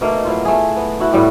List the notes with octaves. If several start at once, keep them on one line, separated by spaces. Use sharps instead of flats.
B2 A3 A#3 D#4
F#3 E4 F4
A3 G#4
B3
E4 F#4
A2 G3 F#4 G4